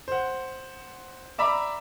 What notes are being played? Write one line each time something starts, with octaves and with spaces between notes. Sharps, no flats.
C5 F#5
D5 E5 A#5 B5 D6